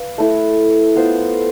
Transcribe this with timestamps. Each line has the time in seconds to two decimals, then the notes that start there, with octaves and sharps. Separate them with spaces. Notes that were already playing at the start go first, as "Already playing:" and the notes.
Already playing: B4 F5
0.18 A3 E4 A4
0.96 B3 F4 C5